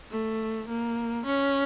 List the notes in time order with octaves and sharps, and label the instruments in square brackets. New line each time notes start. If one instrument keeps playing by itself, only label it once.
[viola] A3
A#3
C#4